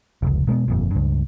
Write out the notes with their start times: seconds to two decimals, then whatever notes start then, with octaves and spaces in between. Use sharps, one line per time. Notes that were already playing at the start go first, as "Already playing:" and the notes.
0.22 F1 C#2
0.47 B2 G#3 A#3 B3
0.68 G1 F2 A#2
0.91 C#2 G2